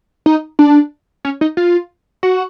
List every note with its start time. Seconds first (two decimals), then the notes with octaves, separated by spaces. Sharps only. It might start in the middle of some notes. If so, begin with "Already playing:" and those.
0.26 D#4
0.59 D4
1.25 C#4
1.41 D#4
1.57 F4
2.23 F#4